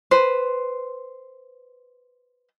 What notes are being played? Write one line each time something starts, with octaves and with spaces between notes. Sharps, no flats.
B4 C5